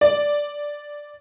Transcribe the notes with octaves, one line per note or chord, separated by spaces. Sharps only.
D5